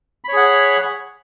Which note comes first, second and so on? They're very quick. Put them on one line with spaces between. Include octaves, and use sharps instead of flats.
B5 C#5 G#4 F#5